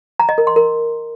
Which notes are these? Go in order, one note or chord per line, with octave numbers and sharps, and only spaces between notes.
A#5
D#5
A#4
C6
A#4